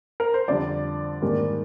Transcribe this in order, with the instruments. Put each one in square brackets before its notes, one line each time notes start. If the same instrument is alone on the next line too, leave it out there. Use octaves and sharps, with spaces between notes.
[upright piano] A#4
C5
F2 D3 G3 D5
G#2 D#3 G3 A#3